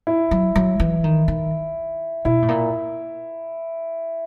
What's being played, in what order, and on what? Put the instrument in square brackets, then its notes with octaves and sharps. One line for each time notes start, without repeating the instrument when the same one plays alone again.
[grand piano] E4
[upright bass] F#3
F#3
E3
D#3
D#3
[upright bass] B2 [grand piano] E4
[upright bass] A2
A#2